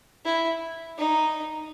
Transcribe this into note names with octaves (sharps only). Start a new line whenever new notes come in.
E4
D#4